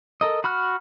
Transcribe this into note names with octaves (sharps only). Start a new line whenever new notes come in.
A4 A#4 D#5
F#4 B5 F6 F#6